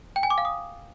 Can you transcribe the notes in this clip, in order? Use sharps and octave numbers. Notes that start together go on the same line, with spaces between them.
G5
G#5
D6
F5
D#6